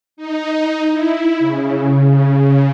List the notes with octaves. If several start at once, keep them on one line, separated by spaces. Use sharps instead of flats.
D#4
E4
C#3